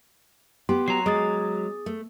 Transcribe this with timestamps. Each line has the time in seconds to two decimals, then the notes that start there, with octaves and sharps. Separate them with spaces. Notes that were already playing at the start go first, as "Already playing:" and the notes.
0.69 B3 G4 C6
0.88 F#3 A#5 C7
1.06 G#3 G#4 D#6 A6
1.86 A3